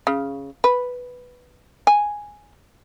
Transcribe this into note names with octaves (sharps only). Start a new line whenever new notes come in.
C#3
B4
G#5